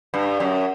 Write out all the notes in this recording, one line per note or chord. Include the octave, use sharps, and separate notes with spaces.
G2
F#2